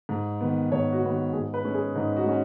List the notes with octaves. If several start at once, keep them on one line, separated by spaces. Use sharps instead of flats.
G#2
D#3 B3
G#2 C#5
F#4
D#3 B3
F#4
G#2 G#4
B4
G#3 C#4
G#4
G#2 D#4
F#4
G#3 C#4